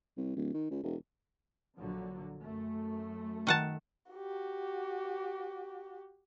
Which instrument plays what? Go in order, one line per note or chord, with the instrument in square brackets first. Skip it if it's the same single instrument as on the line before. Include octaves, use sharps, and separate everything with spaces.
[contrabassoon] C2
D1
D#3
C#2
E1
[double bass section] A#1 D3 F#3
F#2 A3
[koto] D#3 F#5 A5
[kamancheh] F#4 G4